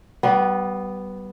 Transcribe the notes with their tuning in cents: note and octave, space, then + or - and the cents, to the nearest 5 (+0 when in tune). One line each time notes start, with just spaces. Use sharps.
G3 -30 B3 +0